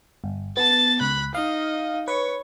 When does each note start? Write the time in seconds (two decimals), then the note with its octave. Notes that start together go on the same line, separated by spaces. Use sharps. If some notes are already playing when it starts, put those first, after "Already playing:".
0.24 G1
0.57 B3 A5 A6
1.01 C#2 B5 F#6
1.34 D#4 D#5 F5
2.08 B4 C#5 C#6